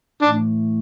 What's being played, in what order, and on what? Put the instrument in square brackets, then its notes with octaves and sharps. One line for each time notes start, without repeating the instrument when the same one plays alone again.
[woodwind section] A2 E3 A3 [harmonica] D4